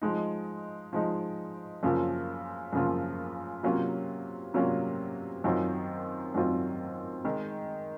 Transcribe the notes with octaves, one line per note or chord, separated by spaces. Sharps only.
F3 G#3 D#4
F3 G#3 D#4
F#2 C#3 F3 A#3 F4
F#2 C#3 F3 A#3 F4
C3 F#3 A#3 C#4 F4
C3 F#3 A#3 C#4 F4
F#2 D#3 F#3 C4 F4
F#2 D#3 F#3 C4 F4
D#3 G#3 D#4